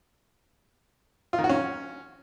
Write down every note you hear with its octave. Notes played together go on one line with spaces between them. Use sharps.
F4
D#3
F#4
C#4